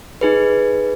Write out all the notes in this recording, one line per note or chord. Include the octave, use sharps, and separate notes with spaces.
D#4 G#4 B4